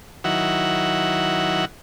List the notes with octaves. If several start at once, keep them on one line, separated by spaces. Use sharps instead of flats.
D#3 F#3 E4 F#5